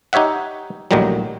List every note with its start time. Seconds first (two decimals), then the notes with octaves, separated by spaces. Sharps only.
0.13 D#4 G4 C#5 E5 F#5
0.91 A#1 D#2 A2 D#3 F#3 G3